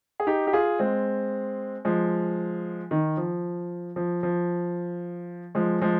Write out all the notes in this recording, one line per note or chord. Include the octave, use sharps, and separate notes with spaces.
G#4
D#4 G4
G4
F4 G#4
G#3 C4
F3 G#3
D#3
F3
F3
F3
F3 G#3
F3 G#3